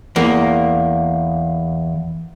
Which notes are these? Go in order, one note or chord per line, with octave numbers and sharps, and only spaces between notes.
E2 A#3